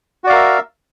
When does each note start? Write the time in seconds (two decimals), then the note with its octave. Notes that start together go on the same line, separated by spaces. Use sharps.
0.24 F#4
0.27 D5
0.30 F5
0.32 A#4
0.35 E5